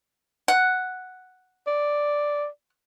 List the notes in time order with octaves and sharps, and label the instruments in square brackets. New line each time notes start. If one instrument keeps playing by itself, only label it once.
[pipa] F#5
[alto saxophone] D5